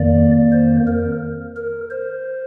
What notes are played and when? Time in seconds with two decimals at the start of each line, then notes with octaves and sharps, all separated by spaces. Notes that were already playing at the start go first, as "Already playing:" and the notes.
Already playing: F2 D#3 A#3 D5
0.52 C5
0.87 A#4
1.56 A#4
1.91 C5